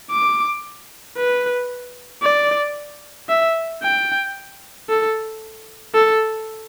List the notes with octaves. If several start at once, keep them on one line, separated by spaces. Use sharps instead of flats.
D6
B4
D5
E5
G5
A4
A4